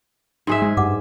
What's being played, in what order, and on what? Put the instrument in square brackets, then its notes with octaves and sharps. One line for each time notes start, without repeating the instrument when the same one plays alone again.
[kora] G#2 G#4 E5
[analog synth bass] G#3
[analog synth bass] G2 [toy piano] F#5 D6